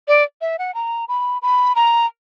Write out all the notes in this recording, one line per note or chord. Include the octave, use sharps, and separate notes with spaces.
D5
E5
F#5
A#5
B5
B5
A#5